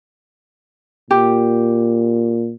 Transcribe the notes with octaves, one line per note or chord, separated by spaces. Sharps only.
A#2 G4